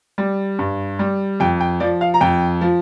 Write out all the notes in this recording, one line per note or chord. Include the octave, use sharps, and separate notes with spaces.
G3
G2
G3
F2 G5
G5
F3 D5
F5
A#5
F2 G5
F3